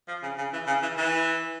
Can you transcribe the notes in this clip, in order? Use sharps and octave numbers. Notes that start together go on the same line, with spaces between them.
F3
C#3
C#3
E3
C#3
E3
E3